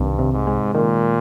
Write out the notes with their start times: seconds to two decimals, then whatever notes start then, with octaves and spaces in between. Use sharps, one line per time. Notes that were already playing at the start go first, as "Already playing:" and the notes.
Already playing: C2 G2 D#3
0.19 C3
0.33 G#2
0.47 G#3
0.74 A#2 D#3